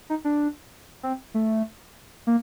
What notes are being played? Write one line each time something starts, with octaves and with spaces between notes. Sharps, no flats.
D#4
D4
C4
A3
A#3